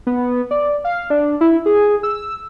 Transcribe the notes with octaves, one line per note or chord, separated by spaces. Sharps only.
B3
D5
F5
D4
E4
G#4
E6